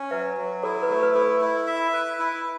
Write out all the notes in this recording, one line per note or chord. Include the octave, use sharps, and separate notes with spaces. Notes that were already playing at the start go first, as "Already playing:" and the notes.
Already playing: C#4
F#3 B4 E5
F#3
E4 A4 C#5
B4
A3 A4
B4
E4 A4
E4
E5
B4
E4